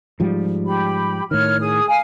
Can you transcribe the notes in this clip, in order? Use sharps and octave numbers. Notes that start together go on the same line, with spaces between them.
G#2 F3 G3
G4 B5
A2 D#3 C#5 F6
G#4 D#6
F5 G#5